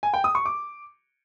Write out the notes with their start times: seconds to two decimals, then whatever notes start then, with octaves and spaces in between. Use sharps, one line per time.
0.03 G#5
0.14 G5
0.24 D#6
0.35 C#6
0.46 D6